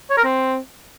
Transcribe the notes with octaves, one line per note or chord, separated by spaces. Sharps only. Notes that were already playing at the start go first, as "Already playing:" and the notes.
C#5
A#4
C4